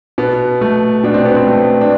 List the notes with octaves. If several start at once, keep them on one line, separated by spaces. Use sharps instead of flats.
B2 B3
A3
B2 D4
C4
B3
C4
A3
D4